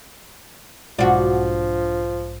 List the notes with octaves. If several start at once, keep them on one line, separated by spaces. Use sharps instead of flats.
B1 G#2 F3 D4 F#4